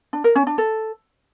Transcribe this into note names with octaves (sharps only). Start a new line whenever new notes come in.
D4
A#4
C#4
D4
A4